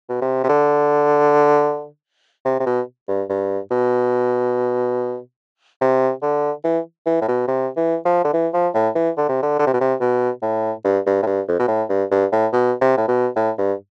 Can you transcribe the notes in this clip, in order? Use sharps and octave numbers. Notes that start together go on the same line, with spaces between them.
B2
C3
C3
D3
C3
C3
B2
G2
G2
B2
C3
D3
E3
E3
A2
B2
C3
E3
F3
D3
E3
F3
A2
E3
D3
C3
D3
D3
C3
B2
C3
B2
A2
G2
G2
A2
G2
F2
B2
A2
G2
G2
A2
B2
C3
A2
B2
A2
G2